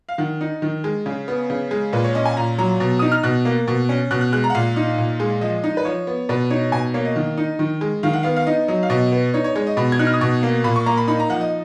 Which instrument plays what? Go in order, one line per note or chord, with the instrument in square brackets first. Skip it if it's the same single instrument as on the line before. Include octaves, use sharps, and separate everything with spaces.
[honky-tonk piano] F5
D#3 F#5
D#4
D#3
G#3
C#3
B3
C#3
G#3
A#2 B4
C#5
C#4 D#5
G#5
A#2 A#5
F#3 A#5
B2
D#4 D#6
F6
B2 F#6
A#3
B2
C#4
B2 F#6
F#6
G#3 F#6
A#5
F#5
A#2 F5
D#4
A#2
G#3
F3 D#5
D#4
B4
F3 C#5
B3
B2 B4
D#4 C#5
B2 G#5
A#3 C#5
D#5
D#3
D#4
D#3
G#3
D#3 F5
F#5
B3 F5
F5
D#4 D#5
F#3 D#5
F5
B2 D#5
B3
D#4 C#5
C#5
G#3 C#5
D#5
B2 B5
G#6
D#4 F#6
F6
D#6
B2 C#6
A#3
A#2 B5
C#6
A#3 A#5
B5
D#4 B5
A#5
F3 F#5
D#5